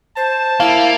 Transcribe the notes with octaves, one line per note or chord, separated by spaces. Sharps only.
C5 A5
A#3 E4 F5